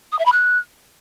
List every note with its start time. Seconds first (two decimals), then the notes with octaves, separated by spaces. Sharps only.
0.12 D#6
0.19 E5
0.26 B5
0.32 F#6